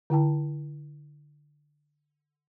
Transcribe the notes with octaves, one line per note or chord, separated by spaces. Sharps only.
D3 E4 G5 A5